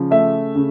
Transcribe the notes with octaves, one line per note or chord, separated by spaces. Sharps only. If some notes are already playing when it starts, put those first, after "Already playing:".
Already playing: C#3 F3
A3 E5
C#3